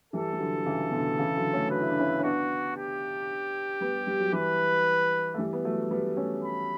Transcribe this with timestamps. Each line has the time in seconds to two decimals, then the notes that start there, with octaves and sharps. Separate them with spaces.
0.13 E3 G3 A4
0.33 G3
0.39 D3 F#3
0.66 C#3 E3
0.92 B2 D3
1.18 C#3 E3
1.36 D3 F#3
1.53 A3 C#4
1.71 F#4 B4
1.81 E4
1.90 D4
1.99 C#4 E4
2.19 C#4
2.23 B3 D4 F#4
2.76 G4
3.81 G3 B3
4.07 G3
4.20 F#3
4.32 E3 G3 B4
5.34 A3
5.38 E3 G3
5.53 B3
5.64 F#3 A3
5.91 G3 B3
6.17 A3 C#4
6.44 B5